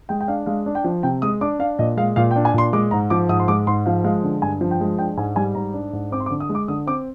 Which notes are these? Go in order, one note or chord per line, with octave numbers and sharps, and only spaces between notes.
G#3 G5
G5
D4 F5
G#3 F5
D4
G5
F3
C3 G5
G#3 D#6
D4 D6
D4 F5
A#2 D#5
G#3 F5
A#2 F5
G5
D4
G#5
A#2 C6
G#3 D6
G#2 A#5
F3 D6
G#2 D#6
C6
G#3 D6
G#2 C6
F3 F5
G#3 F5
D3
G2 G#5
F3
G5
G#3
D4 G5
G#2 G#5
G3 G#5
G#2 A#5
D4
G#2
C4 D6
C6
D6
D3
D#6
G#3
D6
D3 D#6
C4 D6